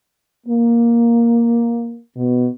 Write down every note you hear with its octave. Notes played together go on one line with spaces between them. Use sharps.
A#3
B2